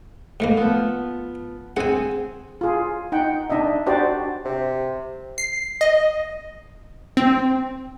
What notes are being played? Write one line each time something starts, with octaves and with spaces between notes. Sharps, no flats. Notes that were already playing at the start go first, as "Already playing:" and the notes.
G#2 A3 A#3
F3 B3
C4 G#4 F#5 G#5
F4 G#4
D#4 F#5 G5
D4 D#4 D#5 E5
D4 F#4 G4 C5 D5
C3
C7
D#5
C4